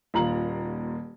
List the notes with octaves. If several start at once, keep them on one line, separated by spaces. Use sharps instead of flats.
D#1 D#2 F4 A#5 F#7